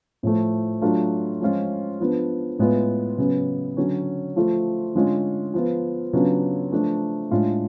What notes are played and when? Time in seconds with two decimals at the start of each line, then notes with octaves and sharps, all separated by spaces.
0.23 A2 F3 A3
0.81 F#3 A3 D4 F4
1.41 F3 G#3 C#4 F4
2.00 F3 B3 D4
2.59 A2 G#3 B3 F4
3.18 C#3 F#3 B3
3.77 D3 F#3 C#4
4.36 F3 A3 F4
4.95 D3 G#3 C#4 F4
5.54 F3 B3 F4
6.13 C#3 F#3 B3 D4 F4
6.72 F3 A3 D4
7.31 A2 G#3 D4 F4